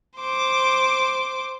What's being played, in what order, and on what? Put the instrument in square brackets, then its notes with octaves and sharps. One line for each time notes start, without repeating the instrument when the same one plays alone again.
[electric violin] C5 D6